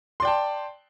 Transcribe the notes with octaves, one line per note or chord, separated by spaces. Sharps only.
D5 G5 A5 C6